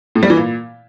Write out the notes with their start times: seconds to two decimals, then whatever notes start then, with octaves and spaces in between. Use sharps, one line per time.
0.15 A2
0.23 G3
0.30 E3
0.37 A#2